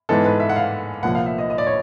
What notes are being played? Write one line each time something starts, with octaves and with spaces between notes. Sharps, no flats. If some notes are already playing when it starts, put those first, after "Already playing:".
G#2 E3 G#3 B3 A4
B4
E5
F#5
F5
C2 A#2 F3 F#5
F5
E5
D#5
D#5
D5
C#5